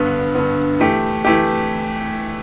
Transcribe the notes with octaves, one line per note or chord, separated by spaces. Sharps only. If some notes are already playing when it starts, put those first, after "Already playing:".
Already playing: G2 D3 B3
G2 D3 B3
E3 A3 G4
E3 A3 G4